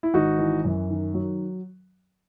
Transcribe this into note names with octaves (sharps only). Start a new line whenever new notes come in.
E4
G#1 D#4 F#4
E3
F#2
D#3
F#3